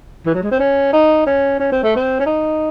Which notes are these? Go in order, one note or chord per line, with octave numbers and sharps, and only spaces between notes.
E3
F#3
G#3
C4
C#4
D#4
C#4
C#4
C4
A3
C4
C#4
D#4